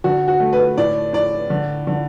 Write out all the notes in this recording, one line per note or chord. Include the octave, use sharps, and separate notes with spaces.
D3 F#4
F#4
A3
B4
A2 D5
A2 D5
D3
D3